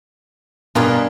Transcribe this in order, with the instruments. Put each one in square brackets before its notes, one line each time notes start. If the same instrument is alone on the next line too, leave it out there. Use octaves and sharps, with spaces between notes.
[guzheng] G2 F4 G#4 [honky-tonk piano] B2 A#4